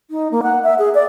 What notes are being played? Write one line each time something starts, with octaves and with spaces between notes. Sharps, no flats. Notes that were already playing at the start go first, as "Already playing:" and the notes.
D#4
A#3
F#5
E5
G#4
D5